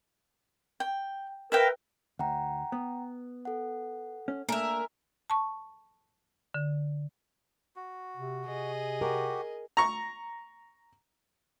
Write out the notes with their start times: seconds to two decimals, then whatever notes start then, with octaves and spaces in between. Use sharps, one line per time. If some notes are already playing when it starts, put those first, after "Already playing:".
0.80 G5
1.52 A#4 B4 E5 F5 G5
2.19 D2 F#5 G5 A#5
2.72 B3
3.45 A4 F#5
4.28 C#4
4.49 A3 A#3 D4 A#4 E5 G#5
5.30 A5 C#6
6.54 D3
7.76 F#4
8.17 C3
8.46 C3 G#4 D#5
9.01 F#4 G4 A#4
9.77 A#5 C#6